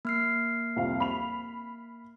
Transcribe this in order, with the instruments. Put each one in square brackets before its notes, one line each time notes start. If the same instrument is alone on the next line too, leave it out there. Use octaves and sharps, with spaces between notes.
[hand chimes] A#3 F6 C7
[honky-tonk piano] C2 F2 F5
B5 F7